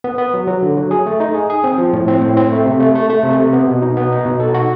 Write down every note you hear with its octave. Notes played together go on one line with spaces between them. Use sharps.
B3
B3
F#3
F#3
D3
F#3
G#4
A3
D#4
G#4
G#4
C4
F3
A2
C4
A2
C4
A3
C3
A3
A3
A3
C3
C3
B3
B2
D#4
B3
D#4
B2
A4
F#4